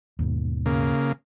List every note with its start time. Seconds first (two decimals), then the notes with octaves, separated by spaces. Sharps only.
0.19 D#2 G#2 B2
0.66 C#3 A#3